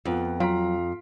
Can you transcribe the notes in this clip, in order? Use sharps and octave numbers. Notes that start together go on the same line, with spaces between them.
F2 B3 F4 F#5
F#3 F4 F5 A#5 B6 D7